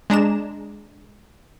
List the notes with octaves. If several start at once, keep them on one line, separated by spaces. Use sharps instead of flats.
G#3 D4 A#5 E7